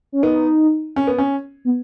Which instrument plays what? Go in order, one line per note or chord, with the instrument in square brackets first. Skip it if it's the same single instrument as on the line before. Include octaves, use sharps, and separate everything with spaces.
[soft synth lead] C#4
[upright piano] B3 [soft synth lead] D#4
[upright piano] C#4
B3
C#4
[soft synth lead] B3